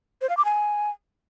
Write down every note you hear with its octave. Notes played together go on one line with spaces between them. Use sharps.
C5
F5
D6
G#5